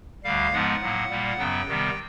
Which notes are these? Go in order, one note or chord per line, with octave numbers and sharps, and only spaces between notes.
D2 D3 G3 F5
G#2 F3 G#3 B3 F#5
A2 F#3 A#3
A#2 G3 A#3
F#2 C#3 F#3 B3 G5
C3 D#3 G3 B3